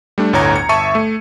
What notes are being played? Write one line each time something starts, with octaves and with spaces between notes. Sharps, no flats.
G3 A3 D4
G1 D2 A2 C#5 A#5 G#6
A#5 C#7
G1 E5 A5 C#6 C#7 D#7
A3